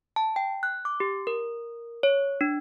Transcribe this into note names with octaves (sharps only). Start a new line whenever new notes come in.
A5
G5
F#6
D6
G4
A#4
C#5
D4